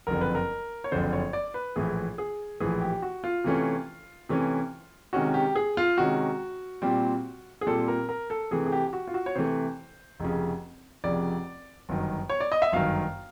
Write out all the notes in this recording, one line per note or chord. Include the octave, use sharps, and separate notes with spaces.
F#1 F2 D3 A#4
B4
A#4
C#5
F#1 F2 D3 C5
C#5
D5
B4
A#1 A2 E3 G#4
G#4
A#1 A2 E3 G#4
G4
F#4
F4
C3 E3 A3 C#4
C3 E3 A3 C#4
C3 D#3 G#3 C#4 F#4
G4
G#4
F4
C3 D#3 G#3 C#4 F#4
A#2 G3 C4
G#4
A#2 G3 C4 A4
A#4
A#4
A4
C3 E3 A3 G#4
G#4
G4
G4
F#4
F4
F#4
C#5
C3 E3 A3 C5
F1 F2 C#3
F1 F2 C#3 D5
G1 F#2 D#3
C#5
D5
D#5
E5
G1 F#2 D#3 F5